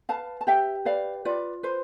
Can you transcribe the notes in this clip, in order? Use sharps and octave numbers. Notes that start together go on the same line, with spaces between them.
B4 F5 A5
A5
G4 E5 G5
B4 D5 F5
F4 B4 D5
B4 C5